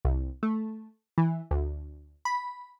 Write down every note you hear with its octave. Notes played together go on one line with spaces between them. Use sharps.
C2
A3
E3
D2
B5